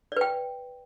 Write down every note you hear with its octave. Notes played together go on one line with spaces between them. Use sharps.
B4 D5 G5